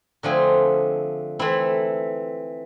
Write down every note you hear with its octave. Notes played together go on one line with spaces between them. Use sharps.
D3 F3 A3 C4 G#4
E3 A3 C4 E4